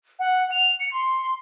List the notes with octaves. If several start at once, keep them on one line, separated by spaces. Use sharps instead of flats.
F#5
F7
C#7
C6